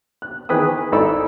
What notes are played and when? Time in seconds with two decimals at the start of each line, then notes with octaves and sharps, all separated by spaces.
0.22 F#6
0.49 D#3 E3 G#4 B4 G5 D#6
0.92 G#1 D#4 E4 A4 D5 B5